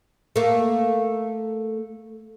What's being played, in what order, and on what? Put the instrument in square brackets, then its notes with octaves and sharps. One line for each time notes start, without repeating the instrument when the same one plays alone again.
[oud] A3 A#3